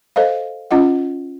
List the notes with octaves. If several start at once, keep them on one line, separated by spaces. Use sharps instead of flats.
A4 C5 D#5 F5
C#4 F4 D#5 F#5